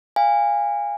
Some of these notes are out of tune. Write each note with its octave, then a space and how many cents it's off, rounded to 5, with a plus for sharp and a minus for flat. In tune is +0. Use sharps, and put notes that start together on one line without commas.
F5 +0 G#5 -25